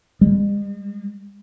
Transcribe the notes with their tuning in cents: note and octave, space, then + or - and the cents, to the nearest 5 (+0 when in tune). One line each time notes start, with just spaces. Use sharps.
G#3 -45